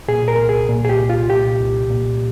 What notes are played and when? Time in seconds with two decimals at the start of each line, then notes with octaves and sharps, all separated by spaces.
0.08 A#2 G#4
0.28 A#4
0.39 C2
0.49 G#4
0.69 A#2
0.85 G#4
0.89 G4
0.99 C2
1.10 F4
1.30 A#2 G4
1.60 C2
1.90 A#2